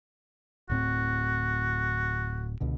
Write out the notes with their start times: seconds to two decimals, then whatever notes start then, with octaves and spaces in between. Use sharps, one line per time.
0.70 D1 A2 C4 F#4
2.61 C#2 B2 D3